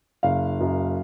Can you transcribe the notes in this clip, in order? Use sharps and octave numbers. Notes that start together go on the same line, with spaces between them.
F#1 F5
F#2